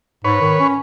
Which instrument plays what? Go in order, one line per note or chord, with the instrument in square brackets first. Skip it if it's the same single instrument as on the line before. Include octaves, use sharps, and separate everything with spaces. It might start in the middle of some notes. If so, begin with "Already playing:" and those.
[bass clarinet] G#2 [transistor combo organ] B4 C#5
[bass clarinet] D#3
C#4